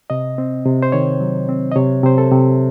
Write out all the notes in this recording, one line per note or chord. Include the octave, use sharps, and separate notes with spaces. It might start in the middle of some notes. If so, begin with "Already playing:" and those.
C3 D#5
C4
C3
C5
D#3 C#5
F#3
C4
D#5
C3 C#5
C3 C5
A4
C3